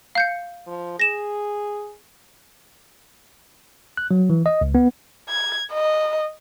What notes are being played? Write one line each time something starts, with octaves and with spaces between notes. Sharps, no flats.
F5 G6 C#7
F3
G#4 A#6 E7
F#6
F#3
E3
D#5
C#2
B3
G#6
D#5